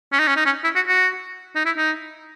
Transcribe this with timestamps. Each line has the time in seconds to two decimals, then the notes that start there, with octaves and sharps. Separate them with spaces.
0.12 C#4
0.19 D#4
0.27 C#4
0.37 D#4
0.45 C#4
0.64 E4
0.75 F#4
0.87 F#4
1.56 D#4
1.66 E4
1.77 D#4